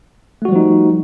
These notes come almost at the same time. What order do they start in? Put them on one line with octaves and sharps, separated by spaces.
A3 F#4 G3 F3 D#4